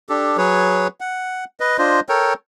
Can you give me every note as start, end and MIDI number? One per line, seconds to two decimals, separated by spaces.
0.09 0.37 62
0.09 0.37 67
0.09 0.37 69
0.37 0.88 54
0.37 0.88 68
0.37 0.88 71
0.37 0.88 73
1.00 1.44 78
1.60 1.77 71
1.60 1.77 75
1.78 2.00 62
1.78 2.00 65
1.78 2.00 72
1.78 2.00 75
2.09 2.34 69
2.09 2.34 70
2.09 2.34 73
2.09 2.34 79